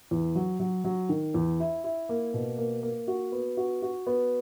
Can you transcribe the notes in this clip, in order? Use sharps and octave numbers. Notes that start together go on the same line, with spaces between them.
E2
F#3
F#3
F#3
D#3
E2
E4
E4
A#3
B2
A#3
A#3
F#4
B3
F#4
F#4
B3